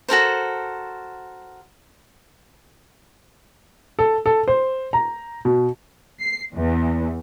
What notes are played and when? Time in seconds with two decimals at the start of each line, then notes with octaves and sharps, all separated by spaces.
0.08 F#4 A4 A#4 C5
3.99 A4
4.26 A4
4.48 C5
4.93 A#5
5.45 B2
6.20 C7
6.53 E2